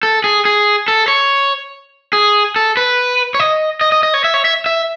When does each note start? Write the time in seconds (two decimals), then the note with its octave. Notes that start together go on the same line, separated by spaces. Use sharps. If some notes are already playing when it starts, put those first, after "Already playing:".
0.03 A4
0.24 G#4
0.45 G#4
0.88 A4
1.08 C#5
2.13 G#4
2.56 A4
2.77 B4
3.34 C#5
3.40 D#5
3.81 D#5
3.92 D#5
4.03 D#5
4.14 C#5
4.24 E5
4.34 C#5
4.45 E5
4.66 E5